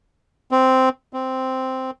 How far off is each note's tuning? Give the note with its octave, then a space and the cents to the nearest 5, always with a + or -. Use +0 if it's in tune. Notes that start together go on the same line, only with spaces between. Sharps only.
C4 -5
C4 -5